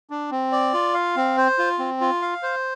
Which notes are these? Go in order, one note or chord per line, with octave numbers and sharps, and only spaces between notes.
D4
C4
D5
F4
F5
C4
C5
F4
C4
F4
F5
C5